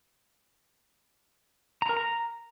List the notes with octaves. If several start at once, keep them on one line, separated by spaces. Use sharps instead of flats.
A#5
A#4
A#5